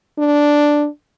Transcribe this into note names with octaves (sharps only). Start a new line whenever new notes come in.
D4